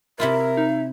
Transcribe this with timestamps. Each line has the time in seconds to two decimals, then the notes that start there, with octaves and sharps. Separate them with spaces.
0.20 C3 E4 F4 A#4 E5
0.57 D#4